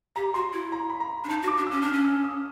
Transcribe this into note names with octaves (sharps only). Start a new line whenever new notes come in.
G4 A#5
F#4 C6
E4
A#5
B5
A#5
D4
D#4 A5
F#4
D6
D4
C#4 E6
D4 F6
C#4
E6
D#6